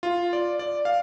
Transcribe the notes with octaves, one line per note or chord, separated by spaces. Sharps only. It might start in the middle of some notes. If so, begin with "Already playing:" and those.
F4
D5
D5
F5